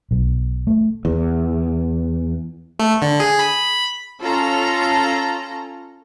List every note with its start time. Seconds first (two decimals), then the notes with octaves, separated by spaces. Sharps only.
0.11 B1
0.67 A3
1.05 E2
2.79 A3
3.02 D3
3.20 G#4
3.39 B5
4.23 C#4 F4 A4 A#5